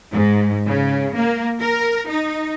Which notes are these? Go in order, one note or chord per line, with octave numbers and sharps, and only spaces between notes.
G#2
C#3
A#3
A#4
D#4